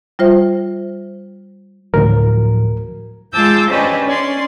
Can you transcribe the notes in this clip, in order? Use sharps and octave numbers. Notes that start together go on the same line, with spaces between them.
G3 F4 C5 E5
D2 A2 F3 F#3 A#4
G#3 F4 A5 D6 E6 G6
C#4 D4 G4 B4 C5 D#5
C#4 D5 C6